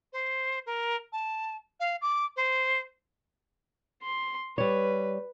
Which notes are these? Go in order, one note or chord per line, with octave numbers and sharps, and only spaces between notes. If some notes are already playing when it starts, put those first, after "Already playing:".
C5
A#4
A5
F5
D6
C5
C6
G3 B4 C#5